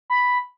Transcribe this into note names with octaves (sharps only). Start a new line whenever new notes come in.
B5